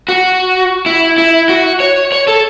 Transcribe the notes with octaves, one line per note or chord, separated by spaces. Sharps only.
F#4
E4
E4
F#4
C#5
C#5
A4